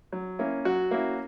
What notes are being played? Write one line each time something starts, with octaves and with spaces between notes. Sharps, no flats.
F#3
A#3 C#4 E4
F#3 F#4
A#3 C#4 E4